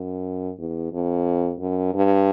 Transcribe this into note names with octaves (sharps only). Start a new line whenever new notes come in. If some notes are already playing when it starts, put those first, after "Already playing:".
Already playing: F#2
E2
F2
F#2
G2